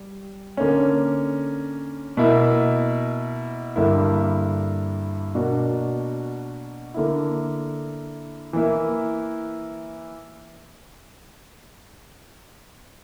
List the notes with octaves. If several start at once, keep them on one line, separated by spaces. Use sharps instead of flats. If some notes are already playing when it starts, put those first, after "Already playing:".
Already playing: G3
D3 A#3 C#4
B2 A#3 E4
G2 D3 A#3 E4
B2 A#3 D4 F#4
D3 A#3 E4
E3 A#3 E4